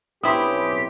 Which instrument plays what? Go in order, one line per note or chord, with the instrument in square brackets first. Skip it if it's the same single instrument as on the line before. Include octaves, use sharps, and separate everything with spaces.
[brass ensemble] B1 C#4 B4 [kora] C4 E4 [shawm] G4 [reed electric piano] B5 D#6